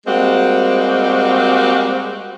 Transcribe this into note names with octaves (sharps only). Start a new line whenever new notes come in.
G3 G#3 A#3 C4 F#4